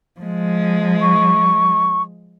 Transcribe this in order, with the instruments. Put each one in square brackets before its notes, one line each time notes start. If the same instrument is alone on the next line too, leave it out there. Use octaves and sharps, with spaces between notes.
[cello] F3 G#3
[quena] C#6